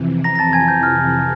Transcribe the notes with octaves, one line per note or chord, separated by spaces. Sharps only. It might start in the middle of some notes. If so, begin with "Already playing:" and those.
Already playing: F2 C3 E3
A#5 A#6
A#6
A5 A6
G#5 G#6
G6
F6